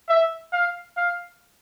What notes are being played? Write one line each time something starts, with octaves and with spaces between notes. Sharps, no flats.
E5
F5
F5